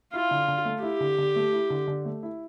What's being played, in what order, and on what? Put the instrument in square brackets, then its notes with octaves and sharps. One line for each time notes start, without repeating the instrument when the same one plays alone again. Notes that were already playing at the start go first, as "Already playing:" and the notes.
[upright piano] E4 [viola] F4
[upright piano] D3
D3
A3
[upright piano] E4 [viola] G4
[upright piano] D3
D3
A3
E4
D3
D3
A3
E4